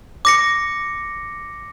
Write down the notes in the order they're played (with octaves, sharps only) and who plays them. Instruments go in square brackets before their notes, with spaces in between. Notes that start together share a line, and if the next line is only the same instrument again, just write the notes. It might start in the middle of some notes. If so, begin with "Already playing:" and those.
[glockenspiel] D6 A#6 C#7